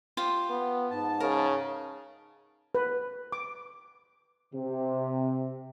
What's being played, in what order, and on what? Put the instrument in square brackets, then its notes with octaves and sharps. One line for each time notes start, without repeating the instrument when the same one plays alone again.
[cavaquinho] F4 G4 C5
[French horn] B3
[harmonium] G#2 A5
[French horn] C#3 [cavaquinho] A#4
[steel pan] B4
D6
[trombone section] C3